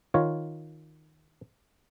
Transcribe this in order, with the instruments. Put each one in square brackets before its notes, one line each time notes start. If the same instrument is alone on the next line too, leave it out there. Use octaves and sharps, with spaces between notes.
[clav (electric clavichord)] D#3 F4 C#5